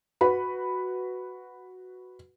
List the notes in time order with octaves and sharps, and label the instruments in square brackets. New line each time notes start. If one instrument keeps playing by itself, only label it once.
[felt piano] F#4 B4 B5